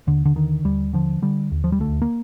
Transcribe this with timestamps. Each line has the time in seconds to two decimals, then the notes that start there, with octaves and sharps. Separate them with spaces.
0.07 D#2 D3
0.25 D3
0.36 D3 D#3
0.64 D#2 G3
0.93 D3 F3
1.22 D3 G3
1.52 D#2
1.64 F3
1.72 G3
1.80 D2 A3
2.02 A#3